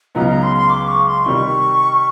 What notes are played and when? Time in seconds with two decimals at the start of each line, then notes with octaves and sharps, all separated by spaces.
0.15 C#2 C#3 F#3 B3 D#4 A#5
0.29 A#5
0.43 C6
0.56 C6
0.70 D6
0.88 C#6
1.06 C6
1.25 C3 D#3 G3 C#6